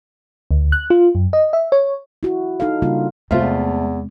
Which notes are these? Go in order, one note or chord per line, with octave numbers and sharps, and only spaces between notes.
D2
F#6
F4
F#2
D#5
E5
C#5
E4 F#4
D#4 A4 F5
C#3 G3 A#3 D4 F4
E2 C3 G#3 A3 F4 C5 E5 F5